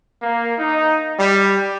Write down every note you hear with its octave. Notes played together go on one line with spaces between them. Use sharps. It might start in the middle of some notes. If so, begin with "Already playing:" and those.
A#3
D#4
G3